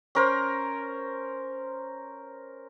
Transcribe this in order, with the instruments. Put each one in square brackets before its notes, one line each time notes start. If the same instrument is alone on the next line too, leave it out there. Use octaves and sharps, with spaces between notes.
[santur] C#4 A#4 C5